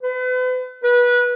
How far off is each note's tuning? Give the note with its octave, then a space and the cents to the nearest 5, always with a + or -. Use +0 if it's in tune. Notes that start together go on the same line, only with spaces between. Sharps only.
B4 +40
B4 -25